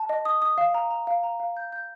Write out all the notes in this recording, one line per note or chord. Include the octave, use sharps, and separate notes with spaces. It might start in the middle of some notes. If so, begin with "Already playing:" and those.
Already playing: A5
D#5
D#6
D#6
F5
A#5
A#5
F5
A#5
F5
G6
G6